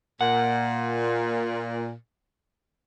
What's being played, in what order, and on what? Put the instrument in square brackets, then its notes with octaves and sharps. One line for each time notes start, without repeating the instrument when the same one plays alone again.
[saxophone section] A#2 [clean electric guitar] F#5